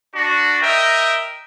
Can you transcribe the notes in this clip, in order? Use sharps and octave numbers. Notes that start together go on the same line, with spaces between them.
D4 F#4
A#4 D#5 E5 G5